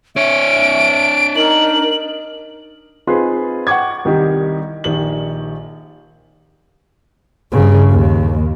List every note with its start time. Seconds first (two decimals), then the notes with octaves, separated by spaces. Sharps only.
0.16 D4 C#5 E5 D7
1.36 D#4 A#4 F#7
3.07 C4 D#4 F4 G#4 B4 C6
3.67 F#5 G5 C#6 D6 G#6
4.05 C2 D#3 G3 D#4 G4
4.84 A#1 D#3 G4 F#7
7.52 G2 C#3
7.90 D#2